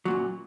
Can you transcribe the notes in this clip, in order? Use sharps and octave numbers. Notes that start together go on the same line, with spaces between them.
F#2 A#2 F#3